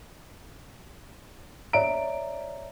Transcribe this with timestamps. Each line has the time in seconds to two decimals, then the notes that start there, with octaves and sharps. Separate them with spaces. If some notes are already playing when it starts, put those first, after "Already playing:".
1.73 C#5 D5 E5 A#5 D7